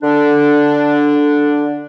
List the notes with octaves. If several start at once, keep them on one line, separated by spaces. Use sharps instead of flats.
D3 D4